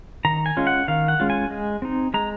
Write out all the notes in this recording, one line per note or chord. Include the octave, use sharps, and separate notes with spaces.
D#3 A#5
G#5
G#3 C#4 F4
F#5
D#3 F5
F#5
G#3 C#4 F4
G#5
G#3
C4 D#4
G#3 A#5